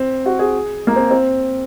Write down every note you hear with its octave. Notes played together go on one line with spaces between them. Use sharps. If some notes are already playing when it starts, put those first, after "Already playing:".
Already playing: C4
F#4
G#4
A#3
C4
C4